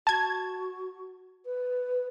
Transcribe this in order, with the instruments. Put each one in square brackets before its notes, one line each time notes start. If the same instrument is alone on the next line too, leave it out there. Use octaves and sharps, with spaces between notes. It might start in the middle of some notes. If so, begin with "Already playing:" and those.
[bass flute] F#4 [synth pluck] A5 G#6
[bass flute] B4